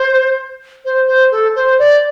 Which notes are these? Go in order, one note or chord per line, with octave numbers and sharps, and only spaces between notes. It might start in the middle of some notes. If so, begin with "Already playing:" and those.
Already playing: C5
C5
C5
A4
C5
D5